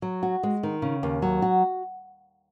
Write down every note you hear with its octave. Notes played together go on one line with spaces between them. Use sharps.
F#3
F#4
G#3
D#3
C#3
D#2
F#3
F#4